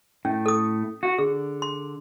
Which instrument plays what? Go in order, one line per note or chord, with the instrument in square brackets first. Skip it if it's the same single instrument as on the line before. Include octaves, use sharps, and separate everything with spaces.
[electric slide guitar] A2 A3 [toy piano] C#4
[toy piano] A4 D#6
[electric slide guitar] F#4
[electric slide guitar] D3 [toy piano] G#4
[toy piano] C6